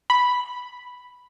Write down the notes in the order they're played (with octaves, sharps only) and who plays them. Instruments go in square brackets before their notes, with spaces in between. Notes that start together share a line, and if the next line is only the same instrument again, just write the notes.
[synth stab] B5